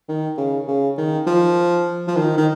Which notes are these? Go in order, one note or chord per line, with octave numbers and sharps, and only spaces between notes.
D#3
C#3
C#3
D#3
F3
F3
D#3
D#3